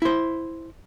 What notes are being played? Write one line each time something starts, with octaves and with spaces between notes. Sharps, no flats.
E4 C5